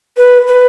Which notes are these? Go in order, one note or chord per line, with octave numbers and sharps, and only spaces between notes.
B4
B4